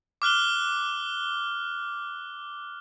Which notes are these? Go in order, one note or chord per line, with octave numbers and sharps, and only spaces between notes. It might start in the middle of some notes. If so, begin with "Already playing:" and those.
D6 F6 F#6 G7